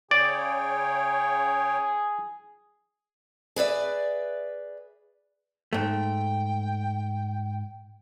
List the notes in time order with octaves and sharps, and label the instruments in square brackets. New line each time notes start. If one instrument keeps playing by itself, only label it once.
[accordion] C#3 C#5 G5 [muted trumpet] G#4 [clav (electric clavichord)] D5
[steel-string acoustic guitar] G#4 B4 D5 E5
[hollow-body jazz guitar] G#2 A3 [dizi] G5